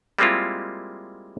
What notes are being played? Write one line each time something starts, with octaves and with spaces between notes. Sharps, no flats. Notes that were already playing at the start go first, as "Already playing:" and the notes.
G3 G#3 A#3 C4 E4 F4